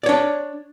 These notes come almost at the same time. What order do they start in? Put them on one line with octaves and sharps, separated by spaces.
D5 C#5 D4